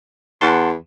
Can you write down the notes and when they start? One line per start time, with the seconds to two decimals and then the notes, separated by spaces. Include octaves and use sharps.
0.41 E2 F#5 A5 C6